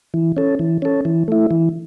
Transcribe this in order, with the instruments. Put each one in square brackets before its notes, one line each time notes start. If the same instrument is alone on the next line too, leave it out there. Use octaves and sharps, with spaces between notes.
[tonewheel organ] E3
C#4 A4
E3
C#4 A4
E3
A3 E4
E3